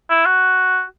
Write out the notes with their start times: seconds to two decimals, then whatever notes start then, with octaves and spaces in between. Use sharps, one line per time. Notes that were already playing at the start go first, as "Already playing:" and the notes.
0.10 E4
0.26 F#4